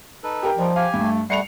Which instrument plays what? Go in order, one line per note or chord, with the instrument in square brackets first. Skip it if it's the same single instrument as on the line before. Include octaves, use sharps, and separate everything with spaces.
[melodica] D#4 A4 B4
[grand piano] G4 A#4 G5
[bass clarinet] F3 [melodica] G3 D#4
[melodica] G4 G#5 [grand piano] F5
[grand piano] G2 [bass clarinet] A3
[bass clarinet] G3 [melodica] A3 F#5 [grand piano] C7 C#7 F7